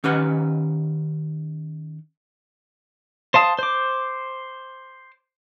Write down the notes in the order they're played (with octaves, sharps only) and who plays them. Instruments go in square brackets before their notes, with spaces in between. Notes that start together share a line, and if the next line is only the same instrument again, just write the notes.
[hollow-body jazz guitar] D#3 C#4 G4 B4 F#5
[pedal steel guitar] C5 F5 A5 D#6
C5 D6